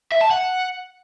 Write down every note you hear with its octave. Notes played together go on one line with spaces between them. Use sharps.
E5
A5
F#5